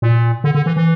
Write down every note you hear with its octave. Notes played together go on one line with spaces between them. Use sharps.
A#2
D3
D3
E3
E3